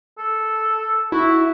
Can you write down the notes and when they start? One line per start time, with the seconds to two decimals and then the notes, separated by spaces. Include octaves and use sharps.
0.18 A4
1.12 E4 F#4